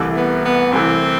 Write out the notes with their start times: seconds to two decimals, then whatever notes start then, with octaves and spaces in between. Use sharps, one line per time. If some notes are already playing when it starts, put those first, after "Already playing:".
Already playing: C2 C3 E3 A3
0.17 B3
0.45 B3
0.72 C2 C3 E3 A3 C4